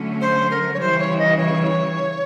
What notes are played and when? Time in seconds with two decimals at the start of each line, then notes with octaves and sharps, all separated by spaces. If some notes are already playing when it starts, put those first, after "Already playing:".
Already playing: D3 F#3 A3 C#4
0.21 C5
0.50 A#4
0.73 C#5
0.79 C#3 E3 G3 C5
0.99 C#5
1.18 D#5
1.37 C#5